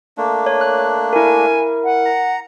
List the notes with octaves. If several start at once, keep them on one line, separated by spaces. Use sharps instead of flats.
A3 A#3 D4
C#5
F#6
E4 A#4 G#5
F#5
A#5